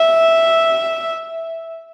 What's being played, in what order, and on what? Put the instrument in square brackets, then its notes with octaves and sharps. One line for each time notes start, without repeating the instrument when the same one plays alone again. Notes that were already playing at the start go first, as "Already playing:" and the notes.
Already playing: [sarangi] E5